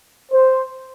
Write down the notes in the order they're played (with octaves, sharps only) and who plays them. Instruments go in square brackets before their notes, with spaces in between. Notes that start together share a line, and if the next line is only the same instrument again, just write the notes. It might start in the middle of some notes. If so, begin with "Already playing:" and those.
[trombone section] C5